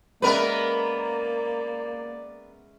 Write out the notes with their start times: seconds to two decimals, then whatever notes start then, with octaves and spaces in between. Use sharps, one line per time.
0.22 G#3 A#3 B3 C#4 A#4 B4 D5 E5